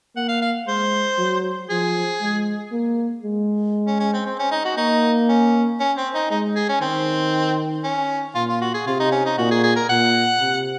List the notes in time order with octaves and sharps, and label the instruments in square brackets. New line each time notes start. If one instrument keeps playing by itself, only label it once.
[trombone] A#3 [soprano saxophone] F#5
[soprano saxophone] F5
F5
[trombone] G#3 [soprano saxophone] C5
[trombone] F#3
[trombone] F3 [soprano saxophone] G#4
[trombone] G#3
A#3
G#3
[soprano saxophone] C#4
C#4
C4
C4
C#4
D#4
F#4
[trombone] A#3 [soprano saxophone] D#4
[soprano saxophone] C#4
C#4
C4
D#4
[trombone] G#3 [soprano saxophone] D#4
[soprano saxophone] G#4
C#4
[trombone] D#3 [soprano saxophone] C4
[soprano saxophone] C#4
[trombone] A#2 [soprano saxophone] F4
[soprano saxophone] F4
F#4
G#4
[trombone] C3 [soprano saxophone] F4
[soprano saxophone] D#4
C#4
D#4
[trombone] A#2 [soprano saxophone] F#4
[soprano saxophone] G#4
G#4
A#4
[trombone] A#2 [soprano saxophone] F#5
[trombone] C3